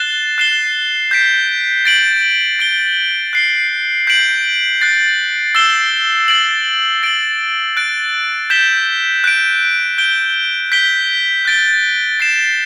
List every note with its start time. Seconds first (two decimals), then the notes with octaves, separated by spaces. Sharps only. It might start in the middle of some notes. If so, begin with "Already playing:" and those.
Already playing: F#6 A6 C7 E7 G7
0.38 F#6 C7 E7 G7
1.11 G6 B6 D7
1.85 A6 D7 F#7
2.59 A6 D7 G7
3.33 F#6 C7 G7
4.07 G6 B6 D7 F#7
4.81 F#6 A6 C7
5.55 E6 A6 C7 E7 G7
6.28 A6 D7 F#7
7.03 A6 D7 F#7
7.77 F#6 A6 D7
8.50 G6 B6 E7 G7
9.24 F#6 B6 D7
9.98 G6 D7 G7
10.72 G6 B6 D7 G7
11.45 F#6 A6 D7 G7
12.20 A6 C7 E7